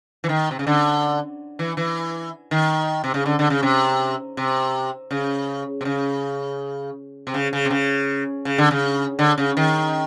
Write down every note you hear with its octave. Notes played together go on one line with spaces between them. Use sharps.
E3
D#3
C3
C#3
D3
E3
E3
D#3
C3
C#3
D3
D3
C#3
C3
C3
C#3
C3
C#3
C3
C#3
C#3
C3
C#3
C#3
D3
C#3
D3
C#3
D#3